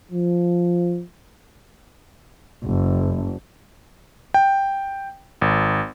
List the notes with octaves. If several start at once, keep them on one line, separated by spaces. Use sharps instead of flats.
F3
F#1
G5
G#1